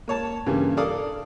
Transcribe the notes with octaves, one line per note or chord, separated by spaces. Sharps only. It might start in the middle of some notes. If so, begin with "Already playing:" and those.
A#3 C#5 A5
G2 C#3 E3 G3 A#3
A4 A#4 D5 F5 D#6